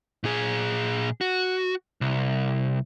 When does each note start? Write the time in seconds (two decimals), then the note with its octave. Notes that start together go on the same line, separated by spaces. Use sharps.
0.24 A#2 G#4
1.21 F#4
2.01 C2